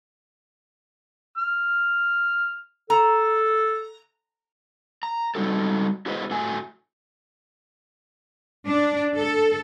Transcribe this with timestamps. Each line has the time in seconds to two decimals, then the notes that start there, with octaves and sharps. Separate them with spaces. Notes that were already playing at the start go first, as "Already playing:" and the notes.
1.38 F6
2.90 A4 A#5
5.03 A#5
5.35 G3 D#4 F#4 A4
6.06 E4 F#4 G#4 B4 C5 D#5
6.31 A2 A3 F#4 G#5
8.67 D4
9.14 A4